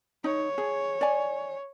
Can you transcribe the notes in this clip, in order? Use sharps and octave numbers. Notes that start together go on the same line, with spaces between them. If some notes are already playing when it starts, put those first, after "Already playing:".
D#4 C#5
G#4
D5 G#5